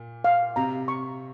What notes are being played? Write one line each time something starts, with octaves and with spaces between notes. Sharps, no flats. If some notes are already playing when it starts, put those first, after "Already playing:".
Already playing: A#2
F5
C3 A#5
C#6